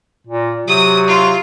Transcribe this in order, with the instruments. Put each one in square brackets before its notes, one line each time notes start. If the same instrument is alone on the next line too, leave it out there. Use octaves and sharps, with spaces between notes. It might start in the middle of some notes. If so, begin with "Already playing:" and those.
[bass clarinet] A#2
[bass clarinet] C3 [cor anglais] F#3 [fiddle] D#6
[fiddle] F4